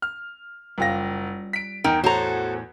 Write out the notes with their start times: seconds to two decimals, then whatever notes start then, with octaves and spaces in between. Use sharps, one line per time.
0.02 F6
0.78 F#1 G3 F4 G4 F5 A#6
1.53 B6 D7
1.84 E2 D#4 A#4 G5
2.04 A2 F#4 A4 C5 C#5 A#5